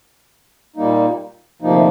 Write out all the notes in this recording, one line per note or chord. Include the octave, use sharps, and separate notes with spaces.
A#2 G3 A#3 D#4
D2 C3 F3 A#3 D#4